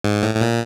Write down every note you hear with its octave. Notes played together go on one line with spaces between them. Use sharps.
G#2
A2
A2
A#2